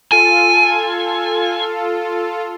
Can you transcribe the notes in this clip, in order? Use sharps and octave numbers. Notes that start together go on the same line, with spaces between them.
F4 A4 G#5